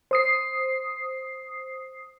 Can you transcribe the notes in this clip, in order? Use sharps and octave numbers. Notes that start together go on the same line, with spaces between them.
C5 D#6 C7